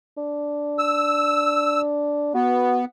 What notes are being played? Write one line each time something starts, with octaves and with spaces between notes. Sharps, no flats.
D4
E6
B3 F#4